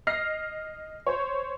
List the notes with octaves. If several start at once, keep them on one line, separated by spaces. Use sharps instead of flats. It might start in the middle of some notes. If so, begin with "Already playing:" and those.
D#5 F6 A#6 C7
C5 C#5